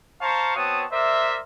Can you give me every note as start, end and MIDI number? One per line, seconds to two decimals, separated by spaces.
0.22 0.52 72
0.22 0.52 77
0.22 0.52 81
0.22 0.52 82
0.22 0.52 85
0.56 0.84 59
0.56 0.84 60
0.56 0.84 66
0.56 0.84 73
0.56 0.84 81
0.56 0.84 87
0.92 1.41 70
0.92 1.41 72
0.92 1.41 74
0.92 1.41 76